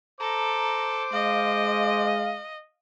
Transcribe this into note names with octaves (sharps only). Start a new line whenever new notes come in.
A4 C5 A#5 D6
G#3 D#5 F5